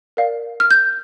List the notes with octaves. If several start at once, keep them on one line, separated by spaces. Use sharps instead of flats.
A#4 D5 F5
F6
G6